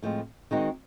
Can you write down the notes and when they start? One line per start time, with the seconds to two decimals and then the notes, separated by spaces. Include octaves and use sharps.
0.02 A2 F3 G#3 C4
0.51 D#3 G#3 C4 D#4 F#4